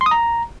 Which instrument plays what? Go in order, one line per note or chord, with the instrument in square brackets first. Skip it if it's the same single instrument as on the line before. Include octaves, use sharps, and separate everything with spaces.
[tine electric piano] C6
D#6
A#5